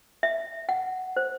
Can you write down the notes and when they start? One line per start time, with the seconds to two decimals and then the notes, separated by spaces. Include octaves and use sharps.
0.23 E5
0.69 F#5
1.17 C5